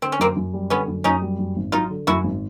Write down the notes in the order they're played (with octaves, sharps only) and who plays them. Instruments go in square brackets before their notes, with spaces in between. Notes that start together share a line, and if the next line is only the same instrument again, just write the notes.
[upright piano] D3 [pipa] C4
[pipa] C#4
[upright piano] F#2 [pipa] A#3 C4
[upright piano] F#2
G3
[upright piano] D3 [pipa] B3 C#4
[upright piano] F#2
[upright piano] F#2 [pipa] C#4 D#4
[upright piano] G3
F#2
G#1
[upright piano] F#3 [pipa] D#4 F4
[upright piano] D3
[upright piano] F#2 [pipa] E4 F#4
[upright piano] G#1